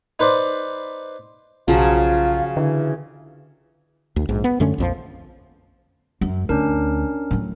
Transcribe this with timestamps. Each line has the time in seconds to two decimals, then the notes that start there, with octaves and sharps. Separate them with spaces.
0.19 D#4 B4 C5 D5
1.68 B1 C#3 F3 F#3 F4
2.57 D3 E3
4.16 D2
4.29 A#1 G#2
4.44 B3
4.60 F#2 D3 A3 C#4
4.78 A#1 F2 F3
6.21 F#2
6.49 D2 C#4 D4 A#4
7.31 A2 F#3